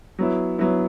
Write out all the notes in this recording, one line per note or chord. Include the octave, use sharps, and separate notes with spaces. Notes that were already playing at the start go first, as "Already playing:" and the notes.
F#3 B3 E4
F#3 B3 E4